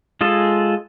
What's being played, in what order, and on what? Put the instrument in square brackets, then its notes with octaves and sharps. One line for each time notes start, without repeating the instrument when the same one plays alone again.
[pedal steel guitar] G#3 F4 G#4 A4